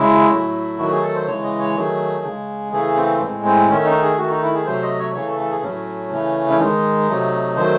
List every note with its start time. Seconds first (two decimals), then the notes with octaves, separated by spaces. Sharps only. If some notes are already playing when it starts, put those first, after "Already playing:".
Already playing: C#3 G#3 E4
0.30 A2 F#3 A3
0.79 D#3 F#3 A3 F#4
0.91 G#4
1.03 A4
1.15 C5
1.27 C#3 E3 G#3 C#5
1.43 D#5
1.59 C#5
1.76 D#3 F#3 A3 G#4
2.24 C#3 G#3
2.72 C#3 E3 A3 G#4
2.97 C4
3.21 A2 G#3 C4
3.45 C4
3.70 D#3 A3 C#4
3.85 D#4
4.02 G#4
4.17 D#3 A3 F#4
4.30 D#4
4.42 E4
4.54 G#4
4.66 C3 F#3 A3 C5
4.83 D#5
4.99 C#5
5.15 C#3 E3 A3 C#5
5.27 A4
5.39 A4
5.51 G#4
5.63 A2 F#3 A3 C#4
6.12 C#3 E3 A3
6.50 C#4
6.60 D#3 G#3 D#4
7.09 C3 F#3 A3
7.57 D#3 F#3 A3 C5